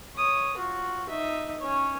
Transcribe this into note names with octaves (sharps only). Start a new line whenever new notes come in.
C#5 D#6
F4 F#4
D#4 E5
C#4 C#5